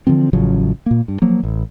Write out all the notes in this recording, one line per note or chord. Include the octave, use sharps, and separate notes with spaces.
D3 E3 F3 C4
A1 C#3 F3 F#3
A#2 A#3
G2
F3 F#3 A#3
A1